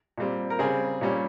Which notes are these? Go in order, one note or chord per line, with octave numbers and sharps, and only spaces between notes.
A#2 G3 C4
A#4
C#3 G3 C4 G#4
A#2 G3 C#4